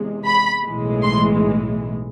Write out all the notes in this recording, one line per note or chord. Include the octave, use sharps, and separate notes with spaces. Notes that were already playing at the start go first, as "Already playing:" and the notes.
Already playing: E2 C3 G#3
B5
B1 A2 E3 G#3
C6